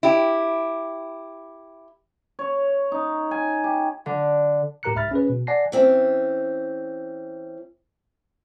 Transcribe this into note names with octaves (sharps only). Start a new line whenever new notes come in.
E4 G4
C#5
D#4
G#5
G4
D3
A2 G4 A#4 A#5 F#6 C#7
C2 G#2 E5 B5 F6 A6
C#4 G#4 B4
B2
D5 F#5 G#5 A5 A#6 C7
E3 C4 C#4